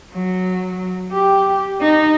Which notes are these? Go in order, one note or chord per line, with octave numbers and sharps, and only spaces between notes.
F#3
G4
D#4